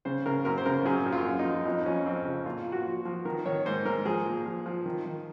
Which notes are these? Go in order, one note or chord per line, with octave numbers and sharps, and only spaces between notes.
C#3 C5
C#3 A#4
F#2 A#4
C5
C#3 A#4
F#2 G#4
F#2
F4
F#2
D#4
F3
F2 D#4
F3 C#4
F2 C4
C#3
A#2 F4
A#2
F#4
F3
F3
D#3 A#4
D#3 C#5
G#2 C5
G#2 A#4
F3 G#4
A#2
F3
F3
D#3
D#3